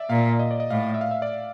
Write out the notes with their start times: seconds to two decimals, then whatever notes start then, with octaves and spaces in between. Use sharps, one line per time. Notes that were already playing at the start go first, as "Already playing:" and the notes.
Already playing: D5 E5
0.10 A#2 F5
0.39 D#5
0.51 D5
0.60 D#5
0.70 A2 F5
0.94 E5
1.01 F5
1.11 E5
1.22 D5